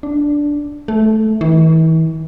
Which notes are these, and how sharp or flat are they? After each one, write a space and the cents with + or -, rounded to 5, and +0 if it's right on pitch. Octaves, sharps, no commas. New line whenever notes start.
D4 -5
A3 -10
E3 -40